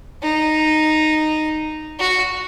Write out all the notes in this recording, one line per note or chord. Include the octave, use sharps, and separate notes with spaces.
D#4
F#4